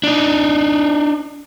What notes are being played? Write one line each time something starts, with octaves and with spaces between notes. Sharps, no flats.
D4 D#4